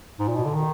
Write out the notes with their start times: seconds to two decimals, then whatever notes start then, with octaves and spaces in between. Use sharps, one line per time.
0.19 G#2
0.28 A#2
0.36 B2
0.45 D3
0.54 D#3